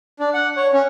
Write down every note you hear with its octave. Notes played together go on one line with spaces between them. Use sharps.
D4
F#5
C#5
C#4